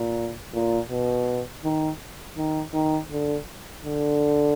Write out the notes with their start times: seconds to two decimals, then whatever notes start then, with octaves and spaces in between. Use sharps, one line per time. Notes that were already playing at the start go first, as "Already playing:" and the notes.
Already playing: A#2
0.53 A#2
0.90 B2
1.64 D#3
2.37 D#3
2.73 D#3
3.11 D3
3.85 D3